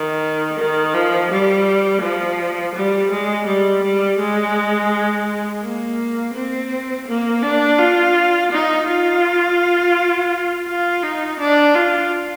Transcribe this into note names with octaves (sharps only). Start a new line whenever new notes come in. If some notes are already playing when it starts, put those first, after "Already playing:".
Already playing: D#3
D#3
F3
G3
F3
G3
G#3
G3
G3
G#3
A#3
C4
A#3
D4
F4
D#4
F4
F4
D#4
D4
F4